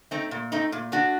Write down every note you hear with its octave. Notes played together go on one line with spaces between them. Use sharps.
A3 C4 D#4
A#2
A3 C4 D#4
A#2
A3 D4 F#4